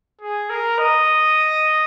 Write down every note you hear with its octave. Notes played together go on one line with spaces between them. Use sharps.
G#4
A#4
D#5